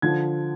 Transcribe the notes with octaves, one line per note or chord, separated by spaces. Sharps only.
D3 F3 G#6